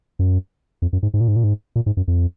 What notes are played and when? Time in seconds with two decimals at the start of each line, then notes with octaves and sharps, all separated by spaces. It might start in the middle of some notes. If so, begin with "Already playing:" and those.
0.19 F#2
0.82 F2
0.93 F#2
1.03 G#2
1.14 G#2
1.21 A#2
1.28 G#2
1.36 A#2
1.44 G#2
1.76 A#2
1.86 G#2
1.97 F#2
2.08 F2